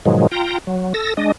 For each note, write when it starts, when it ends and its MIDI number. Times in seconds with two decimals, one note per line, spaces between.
0.05 0.27 44
0.05 0.27 47
0.05 0.27 51
0.05 0.27 53
0.05 0.27 54
0.05 0.27 56
0.32 0.58 65
0.32 0.58 79
0.32 0.58 82
0.67 0.93 54
0.94 1.14 69
0.94 1.14 88
0.94 1.14 94
1.17 1.32 56
1.17 1.32 62
1.17 1.32 75